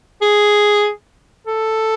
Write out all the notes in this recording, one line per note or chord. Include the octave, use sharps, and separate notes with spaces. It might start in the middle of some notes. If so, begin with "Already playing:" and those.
G#4
A4